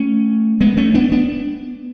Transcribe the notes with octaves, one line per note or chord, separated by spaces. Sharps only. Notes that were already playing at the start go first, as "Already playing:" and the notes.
Already playing: A3 C#4
G#3 B3
A3 C#4
B3 D4
B3 D4